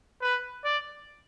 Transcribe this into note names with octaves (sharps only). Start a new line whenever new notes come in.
B4
D5